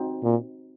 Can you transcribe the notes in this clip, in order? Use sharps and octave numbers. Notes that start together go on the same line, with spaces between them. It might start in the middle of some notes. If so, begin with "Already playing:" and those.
Already playing: C4 D#4 F#4
A#2